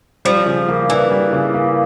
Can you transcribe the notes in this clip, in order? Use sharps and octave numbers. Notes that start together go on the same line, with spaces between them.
F3 G3
C#3
A#3
E3 D4
G3
C#3
A#3